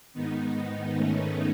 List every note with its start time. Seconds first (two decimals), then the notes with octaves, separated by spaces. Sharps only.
0.14 G#2 D#3 B3 D#4
0.55 B3 D#4
0.96 A3 C#4